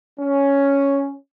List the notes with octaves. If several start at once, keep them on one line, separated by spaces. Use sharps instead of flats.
C#4